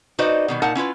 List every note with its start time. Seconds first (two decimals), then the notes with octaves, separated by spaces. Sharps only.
0.19 D#4 F#4 B4 C5 D5 D#5
0.48 B2 D#3 G3
0.62 A#2 D#4 A#4 F#5 A5
0.75 C#4 E4 F4 B4